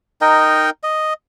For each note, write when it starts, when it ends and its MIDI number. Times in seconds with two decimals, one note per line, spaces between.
0.21 0.70 63
0.21 0.70 70
0.21 0.70 75
0.21 0.70 79
0.83 1.13 75